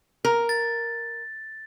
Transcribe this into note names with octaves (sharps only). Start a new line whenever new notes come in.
A#4
A6